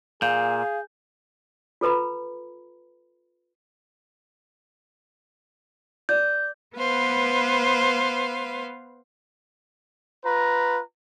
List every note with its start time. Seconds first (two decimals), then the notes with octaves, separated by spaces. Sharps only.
0.22 A#2 G#4 F5 G6
1.81 F4 A4 B4 A#5 B5
6.09 D5 G6
6.75 B3 B4 C5 F5
10.25 F4 B4 A#5